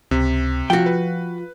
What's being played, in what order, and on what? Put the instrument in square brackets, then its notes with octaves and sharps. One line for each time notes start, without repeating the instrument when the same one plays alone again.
[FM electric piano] C#2 [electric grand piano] C3
[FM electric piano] F3 F4 [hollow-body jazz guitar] F#4 G5
[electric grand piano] B4